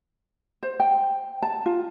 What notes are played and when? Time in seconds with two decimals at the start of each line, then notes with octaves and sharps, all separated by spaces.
0.63 C5
0.80 G5
1.42 A5
1.66 F4